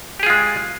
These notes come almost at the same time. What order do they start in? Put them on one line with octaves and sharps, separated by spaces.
G4 G#4 F4 G#3